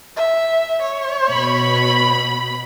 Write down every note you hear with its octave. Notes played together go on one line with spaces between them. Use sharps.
E5
C#5
B2 B5